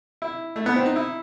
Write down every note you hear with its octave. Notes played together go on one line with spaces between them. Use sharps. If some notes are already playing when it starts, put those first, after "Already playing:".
E4
A3
B3
C4
D#4
E4